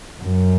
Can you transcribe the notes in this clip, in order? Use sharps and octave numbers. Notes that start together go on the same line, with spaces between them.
F#2